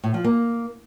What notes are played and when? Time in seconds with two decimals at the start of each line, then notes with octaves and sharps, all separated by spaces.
0.04 A2
0.14 F3
0.24 A#3